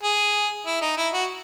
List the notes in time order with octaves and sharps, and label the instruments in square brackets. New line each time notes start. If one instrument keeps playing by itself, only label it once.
[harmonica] G#4
E4
D#4
E4
F#4